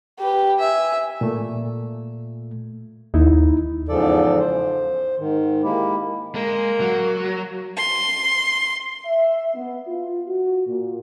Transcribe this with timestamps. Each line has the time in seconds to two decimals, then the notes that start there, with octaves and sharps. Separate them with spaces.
0.20 G4 B4
0.59 E5 G#5
1.21 A#2 A3
3.14 D#2 D#4 E4
3.89 E2 G#2 C#3 F3 A4 D5
4.39 C5
5.18 G#2 D#3
5.63 G#3 A#3 E4 G4
6.35 G#3 A#3
6.81 F#3
7.77 C6
9.05 E5
9.55 B3
9.88 F4
10.27 F#4
10.67 A#2